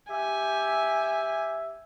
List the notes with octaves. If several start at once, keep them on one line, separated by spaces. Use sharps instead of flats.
G4 E5 G#5